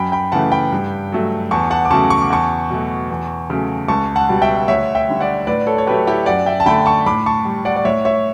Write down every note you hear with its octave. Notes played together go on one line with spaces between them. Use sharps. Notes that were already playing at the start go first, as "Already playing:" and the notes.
Already playing: F#2 G5 B5
G5 B5
C#3 E3 A3 F#5 A5
G5 B5
G2
F#3 A3
E2 A5 C#6
F#5 A5
D6
C#3 F#3 A3 A5 C#6
C#6
D6
E2 A5 C#6
B2 F#3 A3
E2
C#3 F#3 A3
C#2 A5 C#6
F#5 A5
B2 G3
E5 G5
D2 C#5 E5
E5 G5
D3 G3
D5 F#5
A2 B4 D5
A4 C#5
C#5
F#3 A3 G4 B4
E4 G4
F#2 D5 F#5
E5 G5
A5
D3 A3 G5 B5
A5 C#6
A2 B5 D6
A5 C#6
G3
D5 F#5
D5
A2 C#5 E5
C#5 E5